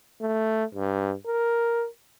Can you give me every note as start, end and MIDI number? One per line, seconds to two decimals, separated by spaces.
0.21 0.65 57
0.75 1.14 43
1.27 1.86 70